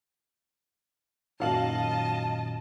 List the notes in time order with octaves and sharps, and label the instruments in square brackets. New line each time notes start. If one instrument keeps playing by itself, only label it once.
[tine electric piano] F#2 A#2 D#3 [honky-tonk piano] F#3 F5 F#7 [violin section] D#5 A5